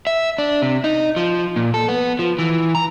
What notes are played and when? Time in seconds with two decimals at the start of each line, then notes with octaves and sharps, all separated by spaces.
0.07 E5
0.38 D4
0.62 C3
0.84 D#4
1.17 F3
1.56 A#2
1.74 A4
1.88 B3
2.19 F3
2.39 E3
2.75 A#5